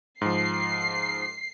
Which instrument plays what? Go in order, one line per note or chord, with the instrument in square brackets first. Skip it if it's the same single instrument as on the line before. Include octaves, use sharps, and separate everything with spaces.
[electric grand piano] G#2 F3 [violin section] C7